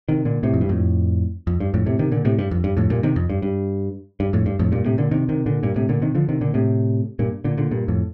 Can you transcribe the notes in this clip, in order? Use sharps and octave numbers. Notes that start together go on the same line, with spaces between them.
C3 D#3
A#2 D3
A2 C3
F2
G2
F2 A2
F2
G2
F2 A2
A2 C3
C3 D#3
A#2 D3
A2 C3
G2
F2
G2
F2 A2
G2 A#2
C3 D#3
F2
G2
G2
G2
F2 A2
G2
F2 A2
G2 A#2
A2 C3
A#2 D3
C3 D#3
C3 D#3
A#2 D3
G2 A#2
A2 C3
A#2 D3
C3 D#3
D3 F3
C3 D#3
A#2 D3
A2 C3
G2 A#2
A#2 D3
A#2 D3
G2 A#2
F2 A2